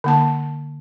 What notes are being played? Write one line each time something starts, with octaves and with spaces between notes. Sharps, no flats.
D3 A#3 A5